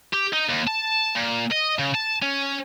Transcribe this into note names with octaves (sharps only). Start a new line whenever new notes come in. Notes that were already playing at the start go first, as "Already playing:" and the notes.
G4
D#4
D#2
A5
A#2
D#5
C#3
A5
C#4